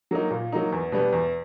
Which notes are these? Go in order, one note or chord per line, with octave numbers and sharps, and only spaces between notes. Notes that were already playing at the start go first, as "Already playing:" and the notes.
F#3 A#3 D#4
A#2
F#3 A#3 D#4
E2
B2 G3 B3
E2